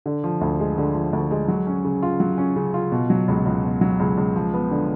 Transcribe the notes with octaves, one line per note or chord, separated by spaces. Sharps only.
D3
F3
D2
G#3
D3
F3
D2
G#3
F#3
C#4
C#3
F4
F#3
C#4
C#3
F4
B2
F#3
C#2
C#2
B2
F#3
C#2
C#2
F3
B3
D3